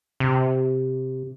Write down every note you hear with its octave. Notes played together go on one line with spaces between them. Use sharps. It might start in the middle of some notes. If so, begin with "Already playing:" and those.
C3